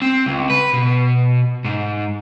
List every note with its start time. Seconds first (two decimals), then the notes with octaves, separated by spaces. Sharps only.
0.02 C4
0.26 C#2
0.50 B4
0.73 B2
1.65 G#2